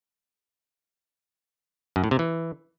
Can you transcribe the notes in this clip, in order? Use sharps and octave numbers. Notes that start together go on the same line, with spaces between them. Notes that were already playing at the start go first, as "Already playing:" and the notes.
F#2
A2
C3
E3